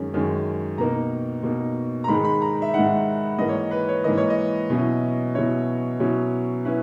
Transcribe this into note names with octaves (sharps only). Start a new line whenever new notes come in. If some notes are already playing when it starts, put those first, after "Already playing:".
Already playing: F#2 D#3 G#3 C#4
F#2 D#3 G#3 C#4
B2 A#3 D#4 A#5
B2 A#3 D#4
A#5
G#2 D#3 G#3 D#4 B5
B5
A#5
E5
G#2 D#3 G#3 D#4 F#5
G#2 E3 A#3 D#5
C#5
D#5
B4
C#5
G#2 E3 A#3 D#5
C#5
D#5
B2 F#3 C#4 E4
B2 F#3 C#4 E4 C#5
B2 F#3 C#4 E4
F#3 C#4 E4 B4